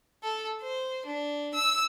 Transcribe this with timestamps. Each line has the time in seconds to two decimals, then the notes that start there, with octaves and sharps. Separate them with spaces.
0.23 A4
0.61 C5
1.06 D4
1.54 E6